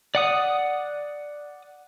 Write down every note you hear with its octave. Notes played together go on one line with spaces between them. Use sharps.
D5 F#5 D#6